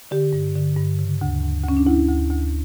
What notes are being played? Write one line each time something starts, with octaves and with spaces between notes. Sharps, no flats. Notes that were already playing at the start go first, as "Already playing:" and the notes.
D3 G4
G2
D3
G2
C#3
D2
D2
D2 C#4
D4
D2 E4
D2
D2